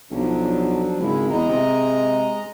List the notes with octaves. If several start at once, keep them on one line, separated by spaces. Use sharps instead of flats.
B1 F3 F#3 D4
G#1 C#3 G#3 E4
E2 G#3 D#5 A#5
C3